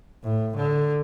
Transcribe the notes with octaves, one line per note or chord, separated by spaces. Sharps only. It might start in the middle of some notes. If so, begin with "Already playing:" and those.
A2
D3